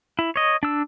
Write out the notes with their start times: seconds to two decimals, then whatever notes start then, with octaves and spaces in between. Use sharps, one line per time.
0.19 E4
0.36 C#5 D#5
0.63 D4 E6